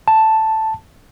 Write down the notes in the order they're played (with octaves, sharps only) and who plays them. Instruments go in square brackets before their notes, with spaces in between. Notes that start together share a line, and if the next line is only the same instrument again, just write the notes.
[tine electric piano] A5